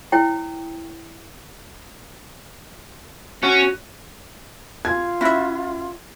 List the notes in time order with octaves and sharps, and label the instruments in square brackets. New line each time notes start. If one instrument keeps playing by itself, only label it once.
[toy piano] E4 C#5 G5
[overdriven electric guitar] C#4 [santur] F#4
[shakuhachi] F4 [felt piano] G#6
[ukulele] C#4 F#4 [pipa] E4 E5